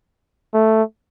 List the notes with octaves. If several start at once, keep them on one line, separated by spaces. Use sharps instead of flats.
A3